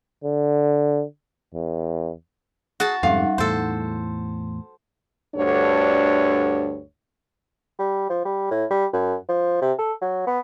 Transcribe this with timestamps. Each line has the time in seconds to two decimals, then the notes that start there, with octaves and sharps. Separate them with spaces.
0.24 D3
1.54 E2
2.80 F#4 G#4 A5
3.03 F2 G#2 C3 G3 D#4 F5 F#5
3.38 E2 A2 A4 C5 C6
5.35 D2 G2 D3 D4 C#5
7.79 G3
8.09 F3
8.25 G3
8.51 A2
8.70 G3
8.93 F#2
9.29 F3
9.61 C3
9.78 A4
10.02 F#3
10.27 B3